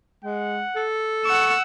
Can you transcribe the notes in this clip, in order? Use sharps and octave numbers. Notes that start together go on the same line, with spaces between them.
G#3 F#5
A4
F#5 C#6 E6